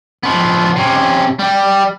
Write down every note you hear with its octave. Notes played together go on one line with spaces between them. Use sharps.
F3 B3
C3 C#4
G3